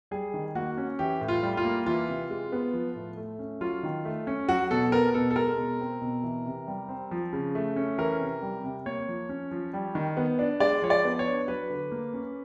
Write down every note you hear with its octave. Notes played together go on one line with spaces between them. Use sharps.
G3 G#4
D#3
A#3 F#4
C#4
E3 G4
A2
F4
G3
F4
A#3
E3 F4
C3
G#3
B3
F3
A2
A3
C#4
F#3 F4
D#3
A3
C#4
F#3 F#4
B2 A4
B3 A#4
B2 A4
A4
G#3 A#4
B2
C4
B2
E3
C3
G3
C4
F3
C#3
A3
C#4
E3 A#4
C3
G3
C3
A#3 C#5
F3
C#4
F3
G3
D#3
B3
D4
G#3 D5
F3 C#5
D5
B3
C#5
D4
F#3 B4
D3
A#3
C#4